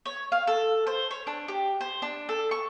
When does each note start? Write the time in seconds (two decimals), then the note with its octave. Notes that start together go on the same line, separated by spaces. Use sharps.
0.06 C#5
0.32 F5
0.47 A4
0.87 C5
1.11 C#5
1.27 D4
1.48 G4
1.81 C5
2.02 D4
2.29 A4
2.51 C#6